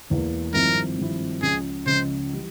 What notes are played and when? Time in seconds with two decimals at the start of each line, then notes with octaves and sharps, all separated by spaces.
0.10 E1 E2 E3 A#3
0.54 G#1 G2 F3 C4 E4 A#4
0.98 G#1 G2 F3 C4 E4
1.42 C#2 C#3 F3 G#4
1.86 C#2 C#3 F3 C5
2.33 E3 G3